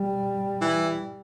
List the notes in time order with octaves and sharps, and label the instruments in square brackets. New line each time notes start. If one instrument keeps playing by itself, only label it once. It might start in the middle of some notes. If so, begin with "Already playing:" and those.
Already playing: [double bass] G3
[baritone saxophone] E3